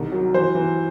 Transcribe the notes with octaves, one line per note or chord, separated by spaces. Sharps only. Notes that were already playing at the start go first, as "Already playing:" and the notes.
Already playing: C2 D#3
F#3
E3 C5
E3